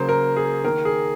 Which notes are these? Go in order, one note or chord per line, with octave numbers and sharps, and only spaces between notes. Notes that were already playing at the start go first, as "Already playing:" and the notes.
Already playing: C#3 F#3 A#3 C5
A#4
G#4
D#3 A#3 A#4
G#4